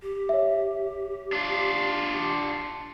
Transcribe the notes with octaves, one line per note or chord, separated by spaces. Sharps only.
G4
C#5 E5
D4 F4